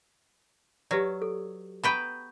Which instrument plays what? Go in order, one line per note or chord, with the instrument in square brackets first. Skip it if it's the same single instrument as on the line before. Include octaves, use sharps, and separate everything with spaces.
[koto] F#3 [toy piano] G4 B4 D5
[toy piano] A4
[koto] B3 B4 G5 [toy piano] A#5 C#6